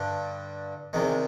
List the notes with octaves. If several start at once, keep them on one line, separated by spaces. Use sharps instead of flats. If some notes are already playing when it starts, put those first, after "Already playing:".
Already playing: G2 D3
C2 C3 D#3 G#3